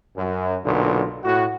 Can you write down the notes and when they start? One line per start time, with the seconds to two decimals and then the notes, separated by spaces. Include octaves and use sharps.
0.17 F#2
0.65 B1 A#2 D3
1.24 A2 F#4